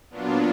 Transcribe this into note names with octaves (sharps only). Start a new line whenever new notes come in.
A#2 F#3 B3 D4 F4